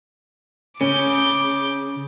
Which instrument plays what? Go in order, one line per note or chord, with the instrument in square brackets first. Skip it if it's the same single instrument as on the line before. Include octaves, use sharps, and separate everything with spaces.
[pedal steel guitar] C#3 [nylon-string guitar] C#4 [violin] D6 G6